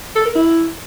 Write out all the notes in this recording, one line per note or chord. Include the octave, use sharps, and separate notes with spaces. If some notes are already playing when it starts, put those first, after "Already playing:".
A4
A#4
E4